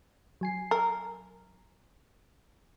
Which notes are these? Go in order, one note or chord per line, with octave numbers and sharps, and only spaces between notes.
F#3 G#5 C7
A#4